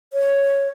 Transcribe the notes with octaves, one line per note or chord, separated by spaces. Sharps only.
C#5